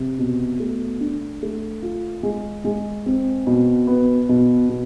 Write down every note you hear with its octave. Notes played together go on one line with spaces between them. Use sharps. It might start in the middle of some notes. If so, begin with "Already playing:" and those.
Already playing: C3
B2
A3
D4
A3
F4
G#3
G#3
C4
B2
B3
B2
B2